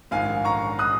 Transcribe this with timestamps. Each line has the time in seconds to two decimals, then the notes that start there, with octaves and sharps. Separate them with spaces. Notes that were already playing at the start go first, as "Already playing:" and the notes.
0.11 A#1 G#2 D#3 F5 G#5
0.45 A#5 C#6
0.79 D#6 F#6